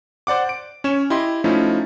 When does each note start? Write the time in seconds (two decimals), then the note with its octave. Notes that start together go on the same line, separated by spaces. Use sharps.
0.27 C5 D5 F#5 D6
0.49 D7
0.84 C#4 C#5 E7
1.10 E4 G4 D#5 C6
1.44 F3 A3 C#4 D#4 E4